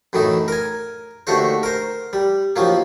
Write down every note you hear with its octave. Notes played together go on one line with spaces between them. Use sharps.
F#2 A2 E3 D#4
A#4 G#5
D#2 D3 A3 F#4 C5
A#4 C5
G3
D#2 F3 F#3 A#3